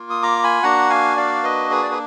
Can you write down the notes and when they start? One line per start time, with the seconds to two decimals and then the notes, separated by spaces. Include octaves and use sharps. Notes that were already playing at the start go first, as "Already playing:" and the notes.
Already playing: A#3 F4
0.10 D#6
0.23 A#5 D6
0.43 G#5 B5
0.63 A#3 D4 F#4 F#5 A#5
0.90 F5 G#5
1.17 D5 F5
1.43 B4 D#5
1.71 G#4 B4
1.83 D5
1.91 B4